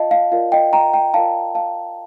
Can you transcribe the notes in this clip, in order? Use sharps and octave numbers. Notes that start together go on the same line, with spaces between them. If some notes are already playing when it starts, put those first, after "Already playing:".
Already playing: F4 D#5 F5 A5
F5
F4 A#4 D5 F5
D#5 G5
G5 A#5
G5 A#5
F4 A#4 D5 F5 A5
F5 A5